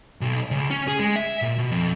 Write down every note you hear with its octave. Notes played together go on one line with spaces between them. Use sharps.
B1
C#2
C#4
G#4
G#3
E5
A#2
B2
F2